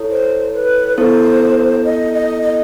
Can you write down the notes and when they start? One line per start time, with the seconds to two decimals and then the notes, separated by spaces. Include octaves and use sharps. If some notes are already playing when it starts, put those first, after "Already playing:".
Already playing: E4 A4 C#5
0.11 C5
0.54 B4
0.98 B3 E4 A4 C5
1.85 D#5
2.13 D#5
2.42 D#5